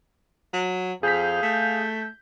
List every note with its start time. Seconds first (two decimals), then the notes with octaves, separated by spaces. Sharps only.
0.54 F#3
1.03 F2 G#4 F5 G6 B6
1.43 A3